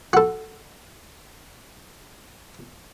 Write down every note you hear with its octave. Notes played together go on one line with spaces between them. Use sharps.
F#4 A4